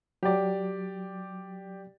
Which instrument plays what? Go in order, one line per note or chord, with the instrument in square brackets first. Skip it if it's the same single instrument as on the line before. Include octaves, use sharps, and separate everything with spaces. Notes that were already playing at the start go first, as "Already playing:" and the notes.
[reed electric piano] F#3 [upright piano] G4 D5